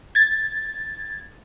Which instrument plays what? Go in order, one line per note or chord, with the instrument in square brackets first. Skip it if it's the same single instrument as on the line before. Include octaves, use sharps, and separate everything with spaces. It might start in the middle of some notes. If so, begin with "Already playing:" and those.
[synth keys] G#6 A6